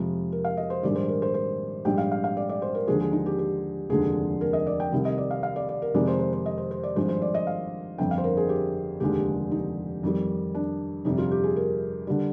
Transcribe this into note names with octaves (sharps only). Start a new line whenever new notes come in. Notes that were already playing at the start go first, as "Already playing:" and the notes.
Already playing: F2 C3 F3 G#3
A#4
F5
D#5
C5
A#1 G#2 D#3 G3 D5
C5
A#4
C5
C5
A#1 G#2 G3 G5
F5
F5
F5
D5
D5
C5
A#4
D#2 D3 F3 G#3 G#4
G#4
D#4
G4
G4
F1 D#2 D3 F3 G#3 G#4
A#4
D#5
D5
G5
C2 C3 D#3
D#5
D5
F5
F5
D5
D5
A#4
F2 C3 D#3 G#3 D5
C5
C5
C5
D#5
C5
C5
D5
G#1 G2 F3 G#3 C5
C5
D5
D#5
F5
G1 F2 D3 G5
F5
C5
A#4
G#4
G4
F1 D#2 D3 F3 G#3 G4
D#4
F2 D#3 G3
D4
G1 F2 C3 G3 D#4
F4
G4
G#4
A#4
D3 G3